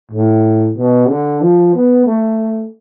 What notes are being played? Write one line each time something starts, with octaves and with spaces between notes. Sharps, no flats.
A2
B2
D3
F3
B3
A3